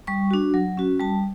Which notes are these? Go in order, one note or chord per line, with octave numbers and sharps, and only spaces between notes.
G3 C#6
D4 F#4
F#3
C#4 F#4
G3 A5